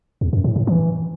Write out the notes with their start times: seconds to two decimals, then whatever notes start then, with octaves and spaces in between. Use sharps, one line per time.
0.21 E2
0.33 F#2
0.44 A2
0.56 A2
0.67 E3